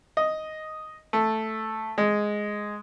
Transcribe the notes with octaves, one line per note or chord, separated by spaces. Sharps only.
D#5
A3
G#3